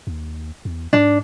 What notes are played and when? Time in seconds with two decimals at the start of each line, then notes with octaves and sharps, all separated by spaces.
0.07 D#2
0.65 E2
0.93 G#2 D4